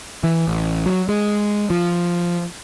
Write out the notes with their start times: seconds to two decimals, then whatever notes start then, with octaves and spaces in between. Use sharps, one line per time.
0.24 E3
0.48 A1
0.86 F#3
1.09 G#3
1.70 F3